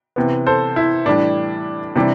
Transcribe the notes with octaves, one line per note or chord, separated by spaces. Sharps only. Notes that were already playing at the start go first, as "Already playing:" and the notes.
C3 E3 B3
A4 C5
E4
A2 E3 G3 D4
C3 E3 G3 D4